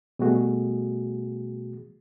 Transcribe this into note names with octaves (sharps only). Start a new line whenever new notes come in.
B2 G3 A3 F#4 G#4